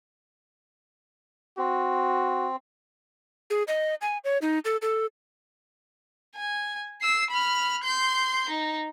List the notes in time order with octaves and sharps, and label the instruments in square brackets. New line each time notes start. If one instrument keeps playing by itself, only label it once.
[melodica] C4 [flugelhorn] F#4
[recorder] G#4
D#5
G#5
C#5
D#4
A4
A4
[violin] G#5
E6 C7
B5 F6
C6 G6
D#4